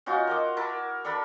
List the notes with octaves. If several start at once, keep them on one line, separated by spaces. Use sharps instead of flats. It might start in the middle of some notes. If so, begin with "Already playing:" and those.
C#4 D#4 F4 F#4
A#4 D#5 D6
E4 A#4 A5
D4 A4 A#4 B5